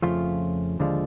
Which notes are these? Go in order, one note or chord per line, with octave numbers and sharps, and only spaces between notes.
F2 C#3 F3 A3 C#4 F4
D#2 D3 F3 G#3